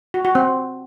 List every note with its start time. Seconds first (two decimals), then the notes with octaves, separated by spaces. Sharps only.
0.14 F#4
0.25 F#4
0.35 C4